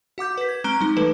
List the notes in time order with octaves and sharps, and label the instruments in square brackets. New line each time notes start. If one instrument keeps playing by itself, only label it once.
[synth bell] F#4 F#5 D6 G6
B4 B6
G#6
G#3 C4 A#5 F#6 D7 G7
G3 D#4
E3 A3 A4 B4